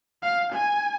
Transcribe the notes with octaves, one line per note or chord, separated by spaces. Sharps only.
F5
G#5